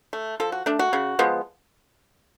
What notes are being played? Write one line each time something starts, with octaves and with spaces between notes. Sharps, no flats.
A3
F3 A4
F#4
A3 D4
F#4
C#3
F3 G#3 B3